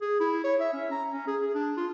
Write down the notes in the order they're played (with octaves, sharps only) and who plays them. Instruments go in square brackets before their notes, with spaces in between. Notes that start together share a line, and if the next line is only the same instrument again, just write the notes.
[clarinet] G#4
E4
C#5
E5
C#4
A#5
C#4
G#4
G#4
D4
F4